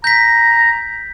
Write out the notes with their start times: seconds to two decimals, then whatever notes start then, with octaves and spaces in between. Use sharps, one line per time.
0.04 A#5 G6 B6